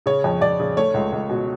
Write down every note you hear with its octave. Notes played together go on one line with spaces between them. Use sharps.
C#3 C#5
F2
F2 D5
C#3
A3 C#5
C#2
C#2
B2